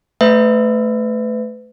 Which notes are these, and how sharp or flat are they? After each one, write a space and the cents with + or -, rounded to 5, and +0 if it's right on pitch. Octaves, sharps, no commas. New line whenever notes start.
A3 +0 B4 +30 E5 +0